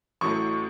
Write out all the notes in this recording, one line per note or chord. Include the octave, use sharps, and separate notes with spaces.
A1 A2 F#3 A3 C#6